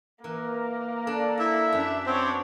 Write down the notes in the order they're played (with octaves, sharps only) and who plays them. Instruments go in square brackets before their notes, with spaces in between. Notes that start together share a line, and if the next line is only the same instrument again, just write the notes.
[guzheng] E3 [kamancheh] A#3 [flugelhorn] A#4
[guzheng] D4 [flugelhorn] A4
[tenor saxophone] E4
[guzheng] F#2 [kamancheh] D4 E5
[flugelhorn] B3 [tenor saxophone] C4 [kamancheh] D4 C#5